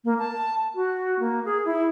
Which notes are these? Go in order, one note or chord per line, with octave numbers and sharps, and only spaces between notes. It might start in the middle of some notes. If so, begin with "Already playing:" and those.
A#3
A5
F#4
A#3
G#4
E4